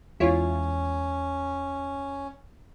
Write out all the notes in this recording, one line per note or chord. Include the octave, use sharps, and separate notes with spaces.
E2 G#3 C#4 E4 F4 C#5